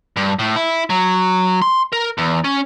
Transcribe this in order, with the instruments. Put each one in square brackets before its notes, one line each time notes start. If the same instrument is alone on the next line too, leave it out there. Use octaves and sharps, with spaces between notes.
[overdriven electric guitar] G2
A2
E4
F#3
C6
A#4
E2
C#4